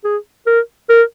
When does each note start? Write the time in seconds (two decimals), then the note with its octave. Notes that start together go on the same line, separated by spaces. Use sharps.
0.04 G#4
0.47 A#4
0.89 A#4